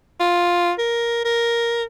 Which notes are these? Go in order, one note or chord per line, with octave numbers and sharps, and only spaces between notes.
F4
A#4
A#4